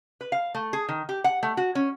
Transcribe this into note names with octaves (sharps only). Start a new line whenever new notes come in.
B4
F5
A3
G#4
D#3
G4
F#5
A3
F#4
C#4